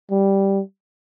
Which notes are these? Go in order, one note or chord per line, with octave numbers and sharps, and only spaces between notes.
G3